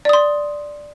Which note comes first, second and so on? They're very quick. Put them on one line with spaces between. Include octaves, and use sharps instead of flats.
D5 D#6 C6